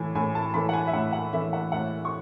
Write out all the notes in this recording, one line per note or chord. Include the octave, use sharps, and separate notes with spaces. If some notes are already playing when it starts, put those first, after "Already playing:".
Already playing: A2 E3 G#5
A2 G#5
A5
E3 A3 B5
F#5
G#5
E5
A2 F#5
F#5
E3 A3 E5
F#5
A2 F#5
C#6